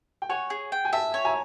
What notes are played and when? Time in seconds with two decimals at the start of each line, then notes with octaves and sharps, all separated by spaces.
0.22 G5
0.29 C#5 F#5 G#5
0.50 G#4
0.72 G5
0.85 G#5
0.93 E5 G5 A5
1.14 C#5
1.25 G#5 A#5